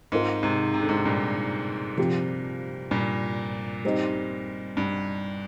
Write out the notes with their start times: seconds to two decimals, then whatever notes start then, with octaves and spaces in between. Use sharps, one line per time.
0.12 G#2 G#3 C4 F4 A#4
0.43 G#2 C3
0.74 C3
0.81 D3
0.89 G#2 C3
1.05 G2 A#2
1.98 C3 F3 C4 G4
2.91 G2 A#2
3.85 G3 C4 D#4
4.77 G2